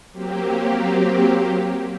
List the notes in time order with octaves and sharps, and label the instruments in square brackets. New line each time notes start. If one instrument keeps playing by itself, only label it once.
[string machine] F#3 A#3 C4 G4